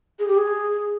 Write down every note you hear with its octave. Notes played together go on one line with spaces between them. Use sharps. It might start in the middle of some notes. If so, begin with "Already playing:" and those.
G#4
G4
G#4